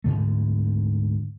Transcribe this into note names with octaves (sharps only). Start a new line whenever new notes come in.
D2 G#2 D3 A3